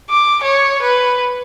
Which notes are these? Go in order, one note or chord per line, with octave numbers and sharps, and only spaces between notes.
D6
C#5
B4